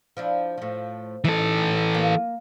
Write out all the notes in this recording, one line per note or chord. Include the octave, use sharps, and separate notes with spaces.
F3 D4 E4
A2 F3
E3 D#4 A4
A#3